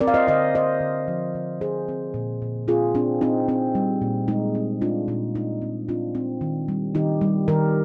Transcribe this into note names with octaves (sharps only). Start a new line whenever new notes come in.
C4 A#4 D5
F5
C5 D#5
D3 C5 D#5
C4 C5 D#5
D3
F3
D3
F3 G#4 C5
C4
A#2
A#2
C4 F4 G#4
C4 D4
C4 D#4
C4
G3
A#2
G#3 D#4
C4
G#3 D4 F4
A#2 D#4
G#3 D#4
C4
C4 D4 F4
C4
D#3
G3
D#3 D#4 G4
G3
D#3 G4 A#4